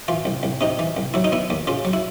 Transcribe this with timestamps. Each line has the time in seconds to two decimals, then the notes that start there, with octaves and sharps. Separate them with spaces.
0.08 E3 F4
0.25 C2
0.43 C2
0.61 C3 D#4
0.79 E3
0.97 C2
1.14 F#3 E4
1.24 D#4
1.32 B3 E4
1.50 D#2
1.67 C#3 F4
1.85 F#3
1.93 E4